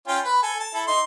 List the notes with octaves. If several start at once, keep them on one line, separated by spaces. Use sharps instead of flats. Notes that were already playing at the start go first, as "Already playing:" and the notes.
C#4 F4 G5
B4 B5
A4 G#5
A5
E4 A4
D#4 C6